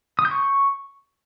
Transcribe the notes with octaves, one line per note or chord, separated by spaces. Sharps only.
D#6
G6
C#6